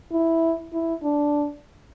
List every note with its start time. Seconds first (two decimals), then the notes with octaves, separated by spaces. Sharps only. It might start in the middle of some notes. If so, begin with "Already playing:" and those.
0.12 E4
0.73 E4
1.03 D4